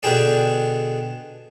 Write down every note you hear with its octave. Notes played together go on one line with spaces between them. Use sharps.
B2 D3 D4 G4 G#4 D5